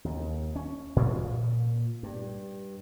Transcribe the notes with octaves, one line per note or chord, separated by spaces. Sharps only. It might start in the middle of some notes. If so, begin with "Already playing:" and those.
D#2
C#4
A#2
G2